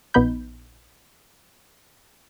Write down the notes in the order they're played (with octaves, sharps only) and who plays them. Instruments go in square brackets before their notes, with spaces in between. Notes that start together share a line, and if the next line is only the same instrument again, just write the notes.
[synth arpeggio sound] A#1 B3 D#4 B5 G6